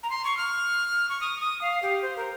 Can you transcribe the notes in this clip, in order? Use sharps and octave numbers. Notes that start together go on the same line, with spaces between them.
A#5
C6
C#6
F6
C#6
D#6
D#6
F5
G4
C5
A#4